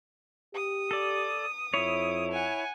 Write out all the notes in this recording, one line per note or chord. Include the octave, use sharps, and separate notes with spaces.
G4 D#6
A4 D5
F2 E4 C#5
F#5 G#5